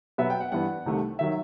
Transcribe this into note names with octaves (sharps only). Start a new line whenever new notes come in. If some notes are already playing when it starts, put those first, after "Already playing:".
B2 F#3 B3 E5
G5
F#5
G2 E3 B3 F#5
C2 C3 D#3 A3
D#3 F#3 E5